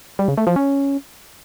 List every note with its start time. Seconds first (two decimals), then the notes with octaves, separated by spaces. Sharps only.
0.19 G3
0.28 C#3
0.38 A3
0.47 F3
0.56 C#4